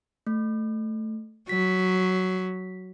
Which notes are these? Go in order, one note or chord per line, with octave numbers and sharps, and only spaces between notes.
A3
F#3 B6